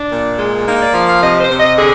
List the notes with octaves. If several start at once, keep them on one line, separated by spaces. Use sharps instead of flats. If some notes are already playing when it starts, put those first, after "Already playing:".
Already playing: D4
A#2
G#3
A#3 D#4
D5
F3 F5
F5
C3 D#5
C5
C3
D#5
D3 G#4